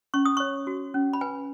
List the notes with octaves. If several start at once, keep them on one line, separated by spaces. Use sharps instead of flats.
C#4 C#6
D#6
C#5 C#6
F#4
C#4
B5
B4 G#5